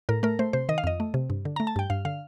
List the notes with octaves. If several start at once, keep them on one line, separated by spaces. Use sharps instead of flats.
A2 A#4
A3 A#4
A3 C5
C3 C5
D#3 D#5
F5
F2 D#5
A3
C3
G2
D3
A3 A#5
A5
G2 G5
G2 F5
D3 F5